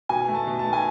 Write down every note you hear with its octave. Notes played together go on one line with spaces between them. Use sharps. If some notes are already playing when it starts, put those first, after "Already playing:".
B2 G#5
A3
A5
B2
A5
A3
G#5